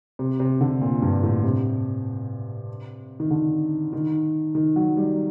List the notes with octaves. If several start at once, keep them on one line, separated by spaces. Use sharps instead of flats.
C3
C3
D3
A#2
G2
A2
C3
D#3
D3
D#3
D#3
F#3
G3